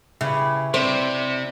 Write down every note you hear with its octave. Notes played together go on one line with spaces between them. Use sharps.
C#3 E4 G4 B4
C3 C4 D4 C5